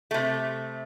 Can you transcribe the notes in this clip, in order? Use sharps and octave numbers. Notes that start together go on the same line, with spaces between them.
C3 A3